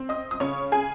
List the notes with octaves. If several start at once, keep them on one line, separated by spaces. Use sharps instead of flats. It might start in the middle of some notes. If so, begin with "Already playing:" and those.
Already playing: C4
D#5 D#6
D#6
C#3 C#5 C#6
G#4 G#5